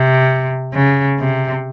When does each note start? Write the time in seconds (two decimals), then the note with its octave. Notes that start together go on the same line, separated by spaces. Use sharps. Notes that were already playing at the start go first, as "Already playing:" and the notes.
Already playing: C3
0.74 C#3
1.19 C3